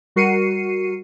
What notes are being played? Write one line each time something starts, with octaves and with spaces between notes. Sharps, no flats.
G3 F#4 A#4 C7 C#7 D#7